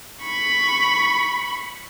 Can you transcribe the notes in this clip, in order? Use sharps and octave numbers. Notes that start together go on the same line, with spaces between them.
B5 C#6